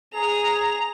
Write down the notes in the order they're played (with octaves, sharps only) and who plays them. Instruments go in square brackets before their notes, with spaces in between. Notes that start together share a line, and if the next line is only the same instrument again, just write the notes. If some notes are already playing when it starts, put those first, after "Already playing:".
[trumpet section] G#4 [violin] A#5 F7